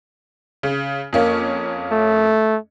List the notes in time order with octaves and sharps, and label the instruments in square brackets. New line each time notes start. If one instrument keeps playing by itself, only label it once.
[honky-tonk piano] C#3
F2 A#3 C#4
[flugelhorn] A3